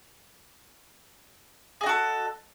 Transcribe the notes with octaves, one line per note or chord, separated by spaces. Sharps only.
F#4 G#4 A4 D#5